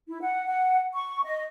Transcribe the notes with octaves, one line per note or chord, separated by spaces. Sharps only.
E4
F#5
F#5
C#6
D#5